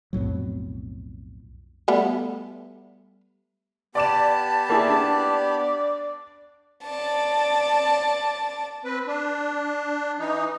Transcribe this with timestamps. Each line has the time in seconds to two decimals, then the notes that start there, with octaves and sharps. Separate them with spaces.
0.13 B1 F2 A2 F#3
1.88 G3 A3 B3
3.95 B3 G4 D5 A5 B5 D6 E7
4.69 A#3 E4 G#4 D5
4.88 D4
6.86 D5 A5
8.85 C4 B4
9.07 D4
10.19 E3 D#4